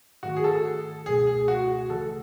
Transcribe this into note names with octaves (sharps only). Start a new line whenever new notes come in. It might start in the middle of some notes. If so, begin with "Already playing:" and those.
G#2 D#3 A3 F#4
G#4
A4
C#2 B2 A3 G#4
G#4
F#4
C#3 E3 A3 A4